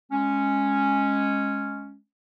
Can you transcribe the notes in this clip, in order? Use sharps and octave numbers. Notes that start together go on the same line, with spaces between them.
G#3 C#4